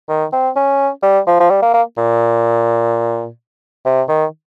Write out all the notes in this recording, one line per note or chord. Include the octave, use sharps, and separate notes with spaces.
D#3
C4
C#4
G3
F3
F3
G3
A#3
A#3
A#2
C3
D#3